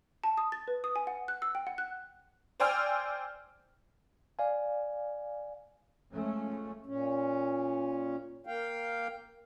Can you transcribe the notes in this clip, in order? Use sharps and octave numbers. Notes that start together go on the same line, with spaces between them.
A5
D#6
A6
B4
D#6
G#5
F#5
F#6
E6
G5
F#5
F#6
C5 D5 G5 G#5 E6 F6
D5 F5 G#5
F3 G#3 A3 C#4
A#2 C#4
A#3 F5 G5